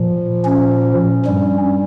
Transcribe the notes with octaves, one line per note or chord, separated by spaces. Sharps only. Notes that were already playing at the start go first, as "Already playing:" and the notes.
Already playing: A#2 F3
C#4
G2 G3